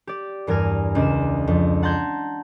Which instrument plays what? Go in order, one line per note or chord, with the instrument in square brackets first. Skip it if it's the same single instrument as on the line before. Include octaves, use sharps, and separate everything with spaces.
[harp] G4 D5
E2 G2 A#4 G#5 F6
C#2 D4 D5 E7
F2
F#5 A5 A#5 C6 G6 G#6